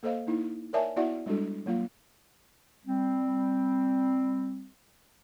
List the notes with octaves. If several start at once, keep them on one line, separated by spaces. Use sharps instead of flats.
A#3 A4 C5 D#5 F5
A#3 D#4 E4
A#4 C#5 D5 E5 G#5 A5
B3 E4 F#4 D5 E5 F#5
G3 G#3 D4 F#4 A4
F#3 A#3 F4 F5
G3 C4